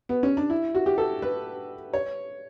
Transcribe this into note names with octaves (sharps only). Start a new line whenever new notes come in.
B3
C#4
D4
E4
F#4
G4
A4
B4
C#5